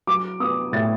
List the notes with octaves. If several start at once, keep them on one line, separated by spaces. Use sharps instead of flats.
F#3 D6
B3 D#6
A2 A6